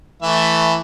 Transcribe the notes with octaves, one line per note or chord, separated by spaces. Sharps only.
E3 A3 E5